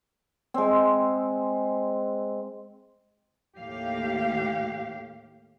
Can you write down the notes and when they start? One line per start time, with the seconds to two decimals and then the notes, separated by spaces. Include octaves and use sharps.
0.54 G#3 C4
3.58 D#2 A2 G4 F5